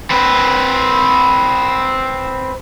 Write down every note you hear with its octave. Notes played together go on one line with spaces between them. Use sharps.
C4 B4